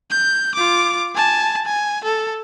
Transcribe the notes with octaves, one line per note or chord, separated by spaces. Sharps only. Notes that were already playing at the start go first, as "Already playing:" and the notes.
G6
F4 D6
G#5 A5
G#5
A4